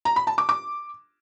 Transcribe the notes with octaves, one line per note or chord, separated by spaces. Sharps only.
A#5
B5
A5
D6
D6